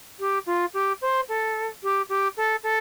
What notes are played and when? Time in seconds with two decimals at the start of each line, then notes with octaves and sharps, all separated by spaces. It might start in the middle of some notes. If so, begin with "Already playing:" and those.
0.20 G4
0.46 F4
0.74 G4
1.02 C5
1.29 A4
1.83 G4
2.09 G4
2.37 A4
2.63 A4